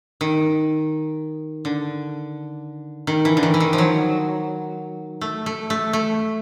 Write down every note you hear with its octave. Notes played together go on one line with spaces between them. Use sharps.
D#3
D3
D#3
E3
D3
D#3
E3
D#3
F3
F#3
A3
A3
A3
A3